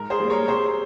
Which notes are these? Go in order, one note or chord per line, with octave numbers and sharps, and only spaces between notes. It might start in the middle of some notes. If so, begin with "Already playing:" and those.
Already playing: G#2 A#4
G#4 C5
G3 A#3
A#4 C#5
C3 G#4 C5